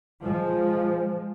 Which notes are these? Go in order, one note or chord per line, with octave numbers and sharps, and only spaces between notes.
F3 G#3